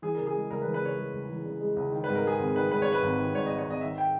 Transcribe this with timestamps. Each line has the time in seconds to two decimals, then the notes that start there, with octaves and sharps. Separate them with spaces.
0.02 E3 G#4
0.15 C#3 A#4
0.27 G#4
0.34 G#3
0.51 C#2 A#4
0.62 B4
0.65 E3
0.74 B4
0.81 C#3 C#5
0.98 G#3
1.14 C#2
1.29 E3
1.45 C#3
1.61 G#3
1.76 C#2
1.92 D#3
2.04 B4
2.08 G#2
2.15 A#4
2.24 G#3 G#4
2.39 G#1
2.55 D#3 B4
2.71 G#2 B4
2.82 C#5
2.87 G#3
2.93 B4
3.02 G#1
3.19 D#3
3.34 G#2 C#5
3.46 D#5
3.51 G#3
3.58 C#5
3.66 G#1 D#5
3.81 D#3 E5
3.98 G5